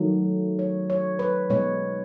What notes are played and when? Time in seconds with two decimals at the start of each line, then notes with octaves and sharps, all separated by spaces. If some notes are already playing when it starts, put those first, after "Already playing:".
Already playing: D#3 F#3 A3
0.59 C#5
0.90 C#5
1.19 B4
1.50 B2 G#3 C#5